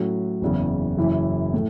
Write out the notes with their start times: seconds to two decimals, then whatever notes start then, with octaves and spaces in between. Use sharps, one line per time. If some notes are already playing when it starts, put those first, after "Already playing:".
Already playing: A2 F#3 C#4
0.42 F#1 E2 C#3
0.97 F#1 F#2 E3 C#4 E4
1.54 A2